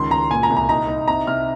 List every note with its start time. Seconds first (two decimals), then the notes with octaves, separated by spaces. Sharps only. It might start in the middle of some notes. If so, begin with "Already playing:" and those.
Already playing: C#2 D#3 C6
0.11 C#2 A#5
0.30 A#2 G#5
0.43 A#5
0.50 C2
0.57 A#5
0.69 D#4 A#5
0.88 D#4
1.08 C3 A#5
1.27 C3 F6